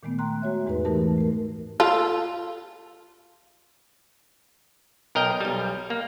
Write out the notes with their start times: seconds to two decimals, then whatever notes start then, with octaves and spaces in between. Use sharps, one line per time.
0.03 A#2 D#3 G#3 A3 B3
0.19 G5 A#5 C6 F#6
0.42 G#3 F#4 C#5 E5
0.66 E2 G#2 G#3 D#4 B4
0.85 E3 A3 D#4 G4 A#4 A5
1.18 A3 A#4
1.80 F4 A4
5.15 B1 A#4 D#5 G5
5.40 B1 G3
5.90 A#3